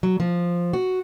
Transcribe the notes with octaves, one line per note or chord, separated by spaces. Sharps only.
F#3
F3
F#4